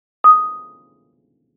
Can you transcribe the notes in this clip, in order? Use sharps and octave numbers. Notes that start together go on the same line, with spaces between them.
D#6